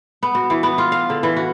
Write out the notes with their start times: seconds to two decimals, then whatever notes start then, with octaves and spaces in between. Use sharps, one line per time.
0.23 B3
0.35 F#4
0.50 E3
0.63 B3
0.78 F4
0.92 F5
1.10 D3
1.23 E3
1.36 F#4